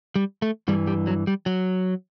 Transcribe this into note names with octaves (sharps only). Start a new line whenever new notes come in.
G3
A3
G2 E3 G3
G3
F#3
G3
F#3